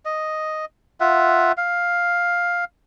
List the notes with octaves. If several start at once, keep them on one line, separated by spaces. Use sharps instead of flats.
D#5
F4 E5 F#5
F5